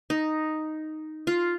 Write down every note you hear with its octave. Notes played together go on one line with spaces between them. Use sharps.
D#4
F4